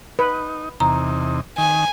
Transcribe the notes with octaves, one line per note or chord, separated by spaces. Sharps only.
D#4 B4
E2 C3 D#4 A#5
D#3 G#5